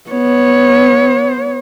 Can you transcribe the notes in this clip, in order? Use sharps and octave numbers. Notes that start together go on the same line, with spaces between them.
B3 C#5